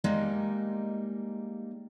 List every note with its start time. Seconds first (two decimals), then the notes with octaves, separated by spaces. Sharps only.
0.04 G3 G#3 A#3 D#4